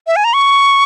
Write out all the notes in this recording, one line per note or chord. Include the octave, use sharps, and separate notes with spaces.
E5
G#5
A#5
C#6